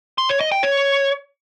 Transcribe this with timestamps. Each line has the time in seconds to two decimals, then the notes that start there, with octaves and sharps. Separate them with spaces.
0.18 C6
0.29 C#5
0.40 D#5
0.52 G5
0.63 C#5